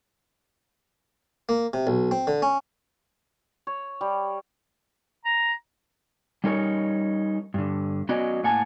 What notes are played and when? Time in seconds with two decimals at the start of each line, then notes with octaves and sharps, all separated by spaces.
1.49 A#3
1.73 C3
1.87 B1
2.11 C4
2.27 D3
2.42 C#4
3.67 C#5
4.01 G3
5.25 A#5
6.44 G3 C#4 D#4 A#4 C#5
7.54 G2 D3
8.09 F#3 B3 C#4 F#4 D5 D#5
8.43 A2 A#3 F#5 G#5 A5